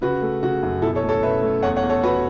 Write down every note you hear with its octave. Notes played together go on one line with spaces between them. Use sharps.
C#3 F#4 B4
A3
C#3 F#4
F#2
B2 E4 A4
A4 C#5
A3
A4 C#5
B2 B4 E5
A3
E2 C#5 F#5
C#5 F#5
E2
A4 C#5
E2 F#4 B4